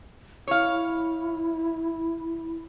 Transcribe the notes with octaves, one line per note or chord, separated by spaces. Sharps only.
E4 C#5 F5